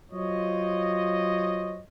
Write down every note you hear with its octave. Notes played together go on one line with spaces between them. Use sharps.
F#3 F4 C5 C#5 D#5